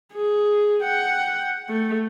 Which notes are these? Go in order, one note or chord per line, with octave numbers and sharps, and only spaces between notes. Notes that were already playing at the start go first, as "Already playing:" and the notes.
G#4
F#5 G5
A3